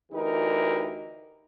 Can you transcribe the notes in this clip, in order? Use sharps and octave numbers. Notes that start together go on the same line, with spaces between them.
D2 E3 D#4 G4 A#4